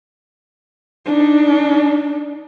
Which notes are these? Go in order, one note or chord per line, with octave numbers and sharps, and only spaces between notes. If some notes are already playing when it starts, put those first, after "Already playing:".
D4 D#4